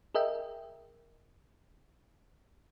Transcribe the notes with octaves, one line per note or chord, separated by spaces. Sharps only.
G#4 A#4 D#5 E5 G5